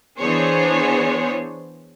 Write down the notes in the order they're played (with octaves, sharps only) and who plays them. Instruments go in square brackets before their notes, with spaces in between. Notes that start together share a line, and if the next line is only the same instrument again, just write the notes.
[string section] E3 B3 D4 G#4 C5 C#5